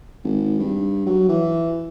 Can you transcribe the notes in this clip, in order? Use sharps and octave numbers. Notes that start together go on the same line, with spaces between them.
G#1
G2
F#3
E3